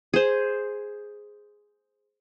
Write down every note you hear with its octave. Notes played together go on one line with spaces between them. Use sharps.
G#4 C5